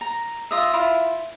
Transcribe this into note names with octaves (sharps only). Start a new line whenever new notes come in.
A#5
F4 D#5 E5
E4 F4